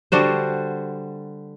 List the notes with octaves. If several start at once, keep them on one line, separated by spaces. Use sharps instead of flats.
D3 G3 F#4 C5